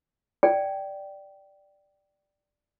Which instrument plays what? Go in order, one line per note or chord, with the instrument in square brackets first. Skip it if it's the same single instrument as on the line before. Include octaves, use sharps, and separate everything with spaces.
[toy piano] D5 G5 G#5